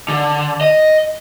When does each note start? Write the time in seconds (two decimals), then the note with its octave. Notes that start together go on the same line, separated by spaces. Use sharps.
0.08 D3
0.61 D#5